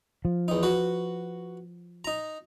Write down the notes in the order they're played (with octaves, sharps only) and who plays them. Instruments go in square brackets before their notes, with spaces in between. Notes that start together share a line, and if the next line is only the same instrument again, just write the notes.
[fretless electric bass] F3
[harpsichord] E2 D#4
F#4 B4
D#4 A#5